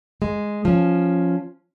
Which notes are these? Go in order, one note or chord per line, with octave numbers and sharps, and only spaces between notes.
G#3
F3 C#4